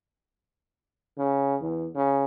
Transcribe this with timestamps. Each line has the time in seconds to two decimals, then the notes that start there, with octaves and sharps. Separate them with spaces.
1.18 C#3
1.61 E2
1.95 C#3